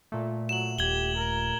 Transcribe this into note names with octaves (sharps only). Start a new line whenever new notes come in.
A#2 A3
F#3 E7 F#7
D#1 G4 G#6 F#7 G7
A#4